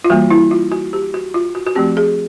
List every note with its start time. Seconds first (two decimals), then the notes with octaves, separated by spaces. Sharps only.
0.04 F4
0.10 E3 G3 A#3 F#4
0.31 E4
0.51 F4
0.72 F#4
0.93 G4
1.14 F#4
1.34 F4
1.55 F#4
1.67 F#4
1.75 F3 A3 C4 G4
1.97 G#4